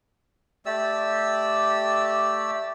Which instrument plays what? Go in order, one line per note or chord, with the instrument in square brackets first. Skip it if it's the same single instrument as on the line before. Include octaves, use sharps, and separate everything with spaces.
[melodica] A3 G4 D5 E6